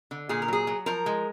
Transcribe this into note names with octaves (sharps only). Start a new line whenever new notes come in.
D3
A#2 G#4
A#4
F#3 G#4
F#3
F3 A#4
G#3